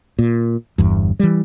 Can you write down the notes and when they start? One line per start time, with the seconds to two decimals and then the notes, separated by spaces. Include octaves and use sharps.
0.19 A#2
0.78 G1 E2 G2
1.19 E3 G3